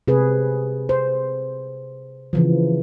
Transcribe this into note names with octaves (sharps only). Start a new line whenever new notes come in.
C3 G#4 B4
C5
C#3 E3 F3